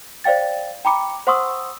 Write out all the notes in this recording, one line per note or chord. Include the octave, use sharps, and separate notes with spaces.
C5 D5 F5 G5 A6
G5 A#5 B5 D6 C#7
C5 F#5 C6 C#6 D#6 E6